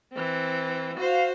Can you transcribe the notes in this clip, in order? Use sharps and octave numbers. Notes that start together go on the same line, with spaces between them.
E3 C4
F#4 C5 F5